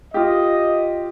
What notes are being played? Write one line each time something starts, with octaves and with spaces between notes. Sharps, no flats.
F4 G4 D#5